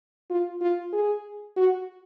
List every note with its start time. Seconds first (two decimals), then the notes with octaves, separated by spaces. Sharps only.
0.30 F4
0.61 F4
0.93 G#4
1.57 F#4